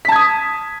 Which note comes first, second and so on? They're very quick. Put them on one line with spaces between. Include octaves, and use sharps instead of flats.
B6 A5 G#6 D#6